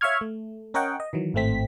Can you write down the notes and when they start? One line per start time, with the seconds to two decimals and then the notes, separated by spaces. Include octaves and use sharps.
0.01 C#5 E5 F5 C#6 F6 G#6
0.21 A3
0.74 C#4 A#4 C#5 D#5 F#5 G5
1.00 D#5
1.13 D#3 E3 F#3
1.34 G#1 A2 A3 C4 B6